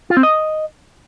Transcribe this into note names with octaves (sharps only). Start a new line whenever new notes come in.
F4
C4
D#5